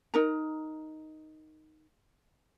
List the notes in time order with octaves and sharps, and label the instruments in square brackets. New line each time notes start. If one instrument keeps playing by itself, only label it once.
[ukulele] D#4 A#4 A#5